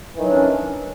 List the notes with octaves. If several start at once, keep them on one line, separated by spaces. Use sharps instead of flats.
D#3 E3 F#3 C#4 D4